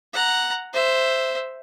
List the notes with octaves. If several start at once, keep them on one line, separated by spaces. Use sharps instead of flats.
F#5 A#5
C5 E5